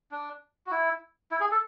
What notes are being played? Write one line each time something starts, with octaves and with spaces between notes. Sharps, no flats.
D4
F#4
E4
E4
G#4
A4